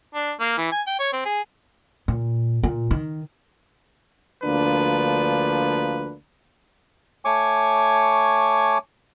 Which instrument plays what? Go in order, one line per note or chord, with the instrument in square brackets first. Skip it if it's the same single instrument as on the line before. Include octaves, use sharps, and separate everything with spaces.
[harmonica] D4
A#3
E3
G#5
G5
C#5
C4
G#4
[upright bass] A#2
A#2
D#3
[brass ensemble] D2 F3 A#3 D4 B4
[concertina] A3 C#5 G#5 C#6 D6